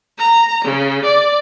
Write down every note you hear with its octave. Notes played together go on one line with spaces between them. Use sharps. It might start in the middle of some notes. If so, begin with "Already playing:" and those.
A#5
C#3
D5